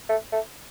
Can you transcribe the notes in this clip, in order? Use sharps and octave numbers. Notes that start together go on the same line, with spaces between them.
A3
A3